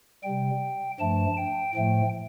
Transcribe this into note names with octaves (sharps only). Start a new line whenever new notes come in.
C3 G3 G5
G2 F3 A3 A5
G5
A2 F3 A3 G5